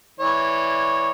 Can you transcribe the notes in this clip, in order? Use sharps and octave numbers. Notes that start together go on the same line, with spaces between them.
E3 C#5 D5